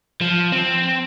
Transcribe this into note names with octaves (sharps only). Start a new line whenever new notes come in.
F3
C4